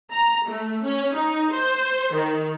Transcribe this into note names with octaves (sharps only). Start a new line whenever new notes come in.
A#5
A3
C#4
D#4
C5
D#3